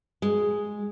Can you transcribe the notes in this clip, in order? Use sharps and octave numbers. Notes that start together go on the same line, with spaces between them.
G#3